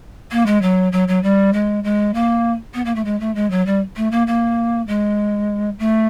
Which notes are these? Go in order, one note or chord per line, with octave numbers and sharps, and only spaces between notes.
A#3
G#3
F#3
F#3
F#3
G3
G#3
G#3
A#3
B3
A#3
A3
G#3
A3
G#3
F#3
G3
A3
A#3
A#3
G#3
A3